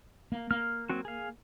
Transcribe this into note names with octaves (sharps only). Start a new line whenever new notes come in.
A#3
A#3 F6
F#3 C4 F#4
G#4 F5